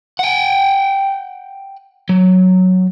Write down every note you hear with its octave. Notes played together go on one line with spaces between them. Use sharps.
F#5 G5
F#3